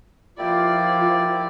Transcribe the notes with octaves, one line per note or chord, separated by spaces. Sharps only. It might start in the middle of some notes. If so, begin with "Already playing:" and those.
F3 A#3 E4 F4 G4 D5